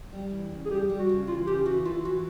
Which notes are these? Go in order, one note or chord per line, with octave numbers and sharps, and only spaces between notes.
G3
E3
C#3
G#4
G3 G4
G3
F#4
C#3
E3 F4
C#3 G4
E3 F#4
E3 F4
E3 F#4